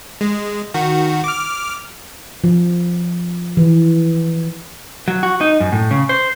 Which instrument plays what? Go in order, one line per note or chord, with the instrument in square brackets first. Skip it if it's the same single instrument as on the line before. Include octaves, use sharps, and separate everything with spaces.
[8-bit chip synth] G#3
D#3 F#4
D6 F6
[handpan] F3
E3
[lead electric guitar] F#3
F#4
D#4
F#2
A2
C#3
C5